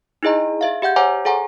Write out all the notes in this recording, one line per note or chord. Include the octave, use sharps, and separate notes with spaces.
D#4 E4 G#4 D#5 A#5
G#4 E5 F5
G4 E5 F#5 G6
C5 C#5 F#5 G#5 A#5 D6
G#4 A4 F#5 G#5 A#5